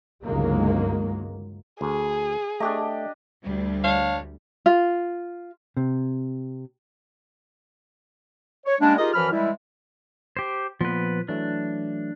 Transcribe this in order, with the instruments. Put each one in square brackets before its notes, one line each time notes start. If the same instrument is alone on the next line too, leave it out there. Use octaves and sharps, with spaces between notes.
[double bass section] G1 C#2 D#3 F#3 G#3 A#3
[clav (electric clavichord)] D2 [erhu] G#4
[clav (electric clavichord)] A3 [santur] D4 G4 D#5
[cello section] D2 G3
[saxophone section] D4 C#5 F5
[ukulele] F4
[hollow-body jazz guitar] C3
[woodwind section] C#5
G3 G#3 A#3 C#4 D4
D#4 F4 G4 G#4 A#4 D#5
F#2 E3 F3 B5 F6
E3 G3 G#3 E4
[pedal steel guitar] G4 C5
[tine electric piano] A#2 B3 C6 [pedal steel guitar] F3 B4
[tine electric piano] E3 F#3 A3 [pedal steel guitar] D4